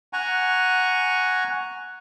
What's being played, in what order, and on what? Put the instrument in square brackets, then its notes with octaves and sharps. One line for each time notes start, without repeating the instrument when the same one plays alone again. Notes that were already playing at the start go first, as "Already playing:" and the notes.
[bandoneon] F#5 G#5 A#5 C#6